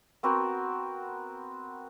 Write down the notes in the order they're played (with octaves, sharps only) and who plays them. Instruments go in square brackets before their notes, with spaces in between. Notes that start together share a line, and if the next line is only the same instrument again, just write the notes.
[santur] B3 C4 F#4 A#4